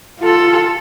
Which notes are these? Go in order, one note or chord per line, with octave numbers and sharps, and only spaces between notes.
F4 A4